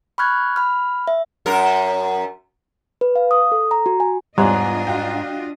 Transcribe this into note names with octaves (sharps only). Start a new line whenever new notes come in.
B5 C#6 F6 F#6 G#6
B5 F6
E5
F#2 A#4
B4
F5
D#6
A4
A#5
F#4
G#5
E2 G#2 G3 D4 F4 C#5 D#5 F#6
F#4 F5 G5